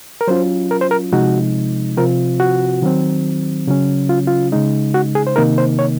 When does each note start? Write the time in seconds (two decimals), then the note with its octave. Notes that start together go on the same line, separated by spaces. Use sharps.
0.21 A#4
0.27 F#3 C#4 F4 C5
0.71 A#4
0.81 C5
0.91 A#4
1.12 C3 F3 G#3 D#4 F#4
1.97 C3 F3 C4 F4 A#4
2.40 F#4
2.82 D#3 F#3 C4
3.67 C#3 F#3 C#4
4.09 F4
4.27 F4
4.52 C#3 G#3 D#4
4.94 F#4
5.15 G#4
5.27 C5
5.36 C3 D#3 A#3 D#4 A#4
5.58 C5
5.79 C#5